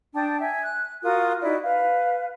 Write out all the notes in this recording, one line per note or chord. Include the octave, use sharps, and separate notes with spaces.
D4 G5 A5 D#6
E5 G#5
F#6
F4 F#4 A#4 D#6
D#4 E4 F#4 D5
B4 F5